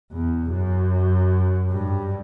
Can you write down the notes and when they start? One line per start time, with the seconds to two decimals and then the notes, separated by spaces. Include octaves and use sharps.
0.13 E2
0.52 F#2
1.70 G2